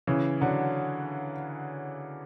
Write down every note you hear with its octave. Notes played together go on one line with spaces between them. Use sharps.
C#3 E3
D3 F#3